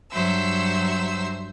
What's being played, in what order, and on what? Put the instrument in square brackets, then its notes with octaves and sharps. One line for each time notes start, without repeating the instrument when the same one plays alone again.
[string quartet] G2 F#3 C5 E5 E6